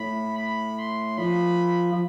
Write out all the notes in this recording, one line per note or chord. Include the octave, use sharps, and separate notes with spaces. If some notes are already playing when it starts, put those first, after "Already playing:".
Already playing: A2 B5
B5
C6
F3 B5
F3